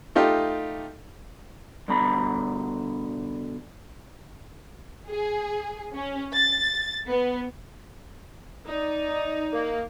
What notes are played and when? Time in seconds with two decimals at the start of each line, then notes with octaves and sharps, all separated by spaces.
0.16 A3 D#4 F4 G4
1.88 G2 B2 D3 A#5 B5
5.09 G#4
5.94 C#4
6.35 A6
7.09 B3
8.68 D#4 D5
9.52 A#3